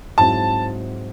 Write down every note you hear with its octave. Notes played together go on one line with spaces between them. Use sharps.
G#2 F#3 C4 E4 A5